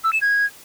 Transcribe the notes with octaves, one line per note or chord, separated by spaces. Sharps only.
E6
E7
G#6